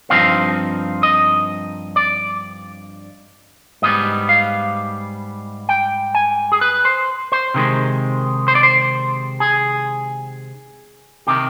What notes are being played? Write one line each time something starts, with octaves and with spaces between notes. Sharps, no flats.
G2 F3 C4 D#4 F5
D#5
D5
G#2 G3 B3 D#5
F5
G5
G#5
G#4
B4
C5
C5
C3 D#3 G#3
C5
D5
C5
G#4
C3 D#3 G4